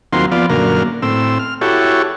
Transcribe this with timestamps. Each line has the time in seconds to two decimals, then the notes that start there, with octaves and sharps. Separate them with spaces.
0.13 D#2 F#3 A#3 C4 F4 C6
0.32 F3 B3 F4 D5
0.50 F#2 A#2 D3 A#3 F6
1.02 A2 C4 E6
1.39 F6
1.61 E4 F#4 G4 A4 C#5